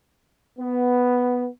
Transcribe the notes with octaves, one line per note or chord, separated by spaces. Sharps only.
B3